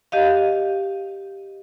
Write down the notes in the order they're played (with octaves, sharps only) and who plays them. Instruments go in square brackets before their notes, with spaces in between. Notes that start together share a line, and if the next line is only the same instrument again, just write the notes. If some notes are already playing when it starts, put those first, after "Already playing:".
[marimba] G4 D#5 F5